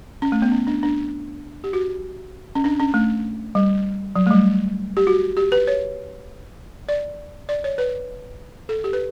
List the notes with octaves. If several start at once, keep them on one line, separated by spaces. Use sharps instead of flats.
C#4
A3
B3
C#4
D4
D4
G4
F#4
C#4
D4
C#4
A3
G3
F#3
A3
G3
G4
F#4
G4
B4
C#5
D5
D5
C#5
B4
A4
G4
B4